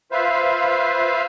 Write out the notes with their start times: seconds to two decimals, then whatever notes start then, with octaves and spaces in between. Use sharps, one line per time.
0.12 F4 B4 C5 E5 F5